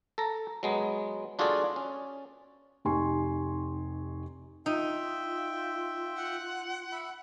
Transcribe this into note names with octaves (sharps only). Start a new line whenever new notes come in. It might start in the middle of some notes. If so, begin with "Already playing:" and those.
A4 A#5
F#3 G#3 B3
D4 F4 F#4 G#4 A4 D5
C#4
F1 D#4 G4 G#5 C6 C#6
D#4 F4 E5 G5
F#5
E5 B5